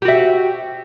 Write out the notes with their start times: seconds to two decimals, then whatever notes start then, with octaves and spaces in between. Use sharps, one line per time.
0.02 G4
0.05 F#4
0.08 E5